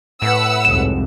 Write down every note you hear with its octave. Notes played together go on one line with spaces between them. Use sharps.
A2 B4 F#5 E6
C2 F2 G#2 E7